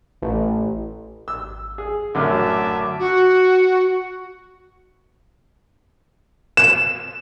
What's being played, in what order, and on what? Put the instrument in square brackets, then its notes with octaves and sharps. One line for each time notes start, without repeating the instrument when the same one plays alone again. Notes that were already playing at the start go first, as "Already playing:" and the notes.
[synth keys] A1
[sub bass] G#1 [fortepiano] E6
[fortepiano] G#4
[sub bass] D#1 [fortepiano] A1 F#2 D3 [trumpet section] E5 A5 D6
[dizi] F#4
[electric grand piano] E7